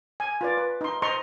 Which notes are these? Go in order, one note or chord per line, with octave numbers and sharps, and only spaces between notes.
G#5
F4 B4 D5
B4
D#4 C6
C5 D#5 A#5 C6 C#6